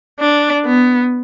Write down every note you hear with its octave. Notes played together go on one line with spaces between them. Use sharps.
D4
B3